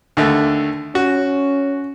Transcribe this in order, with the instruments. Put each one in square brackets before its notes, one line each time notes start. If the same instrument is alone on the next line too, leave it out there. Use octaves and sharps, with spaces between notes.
[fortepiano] D#2 D3 A3
[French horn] C#4 [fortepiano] F#4